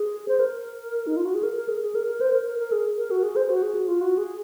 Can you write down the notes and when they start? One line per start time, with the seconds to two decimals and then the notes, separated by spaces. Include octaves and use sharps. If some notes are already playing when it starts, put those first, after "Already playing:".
Already playing: G#4
0.28 C5
0.40 A#4
1.07 D#4
1.17 F4
1.25 F#4
1.34 G#4
1.43 A#4
1.56 A#4
1.68 G#4
1.81 G#4
1.95 A#4
2.07 A#4
2.21 C5
2.33 A#4
2.46 A#4
2.58 A#4
2.72 G#4
2.97 A#4
3.11 F#4
3.23 G#4
3.36 C5
3.49 F#4
3.63 G#4
3.75 F#4
3.88 F4
4.01 F#4
4.18 G#4